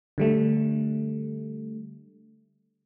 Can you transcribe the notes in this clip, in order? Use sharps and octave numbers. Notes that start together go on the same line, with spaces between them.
D3 G3 A3